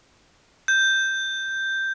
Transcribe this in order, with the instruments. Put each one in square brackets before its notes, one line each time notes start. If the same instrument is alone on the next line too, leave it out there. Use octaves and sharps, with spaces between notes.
[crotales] G6